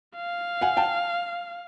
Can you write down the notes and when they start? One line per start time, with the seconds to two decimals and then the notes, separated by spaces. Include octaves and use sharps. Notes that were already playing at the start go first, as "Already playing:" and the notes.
0.16 F5
0.61 F#5 G#5
0.77 G5 A5